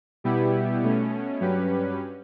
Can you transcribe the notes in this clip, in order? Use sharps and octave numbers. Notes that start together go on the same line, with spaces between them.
B2 G3 B3 E4 G4
B2 A3 C#4
G2 F#3 C#4 G4 B4